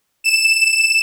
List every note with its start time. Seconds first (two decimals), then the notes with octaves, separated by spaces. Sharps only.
0.24 E7